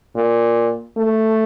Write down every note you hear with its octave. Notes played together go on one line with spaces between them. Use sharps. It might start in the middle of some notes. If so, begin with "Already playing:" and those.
A#2
A3